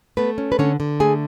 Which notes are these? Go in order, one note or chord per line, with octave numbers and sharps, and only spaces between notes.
A3 B3 B4
C#4
B4
D3 C#4 C#5
D3
A3 G#4 G#5